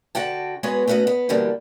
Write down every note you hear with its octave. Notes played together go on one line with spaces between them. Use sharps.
D3 F#4 F#5 G5 A5
G#3 B3 F#4 G#4 C#5
A3 B3 C#4 F#4 D#5
B3
B2 D3 E3 G3 A#3